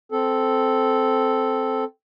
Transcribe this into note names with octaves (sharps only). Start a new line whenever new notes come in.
C4 A4